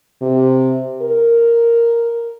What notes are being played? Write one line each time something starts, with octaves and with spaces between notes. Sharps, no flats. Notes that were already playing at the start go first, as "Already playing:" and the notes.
C3
A#4